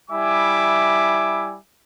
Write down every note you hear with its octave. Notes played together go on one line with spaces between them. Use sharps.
G3 E4 E5 G#5 D6